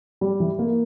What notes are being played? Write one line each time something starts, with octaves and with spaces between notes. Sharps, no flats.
G3
E3
A#3